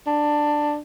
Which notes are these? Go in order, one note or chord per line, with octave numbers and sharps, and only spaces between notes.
D4